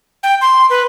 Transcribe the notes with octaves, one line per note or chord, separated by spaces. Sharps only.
G5
C6
B4